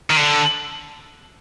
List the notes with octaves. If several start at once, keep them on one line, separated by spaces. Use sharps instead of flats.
D#3
D3